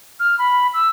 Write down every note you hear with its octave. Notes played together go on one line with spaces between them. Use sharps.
F6
B5
E6